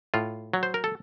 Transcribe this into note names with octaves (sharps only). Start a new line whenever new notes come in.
A2 F4
F#3
C5
A#4
A4